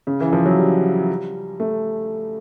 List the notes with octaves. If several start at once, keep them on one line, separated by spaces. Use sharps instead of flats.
C#3
E3
F3
F#3
G3
A3